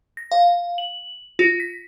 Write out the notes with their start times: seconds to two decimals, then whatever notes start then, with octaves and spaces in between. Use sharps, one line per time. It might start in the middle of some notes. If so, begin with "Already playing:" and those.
0.17 A#6
0.32 F5
0.78 F#7
1.39 F4
1.60 B6